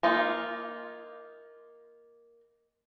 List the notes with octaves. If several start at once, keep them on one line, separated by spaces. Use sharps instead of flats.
A#3 D#4 F4